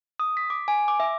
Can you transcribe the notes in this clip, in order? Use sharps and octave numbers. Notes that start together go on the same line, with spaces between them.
D#6
B6
D6
G#5
D6
E5